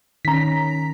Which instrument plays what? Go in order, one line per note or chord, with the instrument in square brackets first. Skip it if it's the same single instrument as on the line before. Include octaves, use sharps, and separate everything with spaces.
[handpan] D#3 C#4 [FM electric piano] A#5 B6